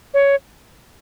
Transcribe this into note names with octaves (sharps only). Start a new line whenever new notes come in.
C#5